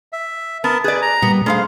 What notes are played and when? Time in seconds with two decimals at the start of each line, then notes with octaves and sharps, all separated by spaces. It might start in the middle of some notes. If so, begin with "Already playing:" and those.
0.13 E5
0.64 B3 A#4 A5
0.84 G#4 B4 D5
1.02 A#5
1.22 A#2 G3 B3
1.46 G2 A3 G#4 C5 F5